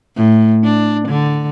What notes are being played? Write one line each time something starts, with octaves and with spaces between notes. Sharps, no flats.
A2
D4
D3